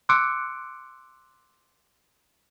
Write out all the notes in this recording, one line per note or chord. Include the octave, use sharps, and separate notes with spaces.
C6 D6 E6 F#6 C#7 D7